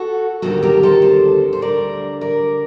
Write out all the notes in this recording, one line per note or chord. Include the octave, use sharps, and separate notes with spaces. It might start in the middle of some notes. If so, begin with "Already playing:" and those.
Already playing: F#4 A4
D2 C3 D#3 G3 F#4 A4
G4 A#4
A4 C5
A4 C5
C5
D2 D3 G3 A#4 D5
A#4 D5